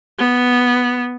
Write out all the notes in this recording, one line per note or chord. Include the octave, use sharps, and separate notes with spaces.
B3